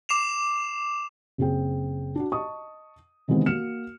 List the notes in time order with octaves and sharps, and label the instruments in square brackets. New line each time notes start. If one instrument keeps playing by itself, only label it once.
[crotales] D6 C7 E7 F7
[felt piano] F#1 C4 G#4 G5
D4 F#4
D#5 A5 C#6 D#6
C3 D#3 E3 G#3 B3 C4
A#3 F#4 F6 C#7 E7